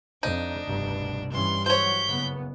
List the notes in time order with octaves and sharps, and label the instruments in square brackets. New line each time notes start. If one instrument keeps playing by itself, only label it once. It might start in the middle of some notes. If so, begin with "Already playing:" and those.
[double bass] F2 [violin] D4 [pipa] D#4
[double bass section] F1 C2 B2 [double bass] G2
[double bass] G2 [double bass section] E3 G3 C#4 [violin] C6
[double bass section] E3 F#3 [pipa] C5 C#5 [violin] G6 B6
[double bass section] F#1 C#3 B3